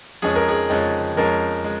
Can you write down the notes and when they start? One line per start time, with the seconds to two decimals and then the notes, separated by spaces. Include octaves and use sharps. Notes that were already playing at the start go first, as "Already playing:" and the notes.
0.22 F2 F3 G#3 C#4 G#4
0.36 A#4
0.49 G#4
0.70 F2 F3 G#3 C#4
1.16 F2 F3 G#3 C#4 A#4
1.64 G#3